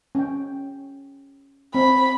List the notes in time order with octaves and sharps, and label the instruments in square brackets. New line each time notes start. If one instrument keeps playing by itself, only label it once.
[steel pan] C#4 G5
[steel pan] C4 [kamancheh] B5